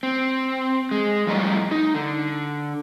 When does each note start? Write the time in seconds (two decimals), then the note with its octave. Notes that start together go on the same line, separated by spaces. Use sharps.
0.03 C4
0.91 G#3
1.27 F2 A2 G3 A4 D#5 A#5
1.71 D#4
1.95 D3